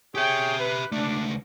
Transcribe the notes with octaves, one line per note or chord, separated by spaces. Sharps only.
G4 G#4 C#5 E5 G5
B4
C#2 A3 D4